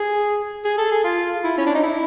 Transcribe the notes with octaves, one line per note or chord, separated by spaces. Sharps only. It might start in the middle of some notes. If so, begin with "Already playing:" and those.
Already playing: G#4
G#4
A4
G#4
F4
E4
C#4
D4
D#4
E4